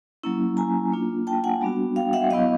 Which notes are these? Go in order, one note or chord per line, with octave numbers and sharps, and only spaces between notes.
F#3 A#3 C#4 E4
G#5 A#5
A#3 D4 F4
G5 A5
F#5 G#5
G3 B3 D4 F#4
F5 G5
E5 F#5
F#3 B3 E4 D#5 F5